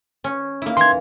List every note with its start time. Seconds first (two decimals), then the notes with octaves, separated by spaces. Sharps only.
0.24 C#4
0.62 A#3 E4
0.77 E3 A#5 C6 G#6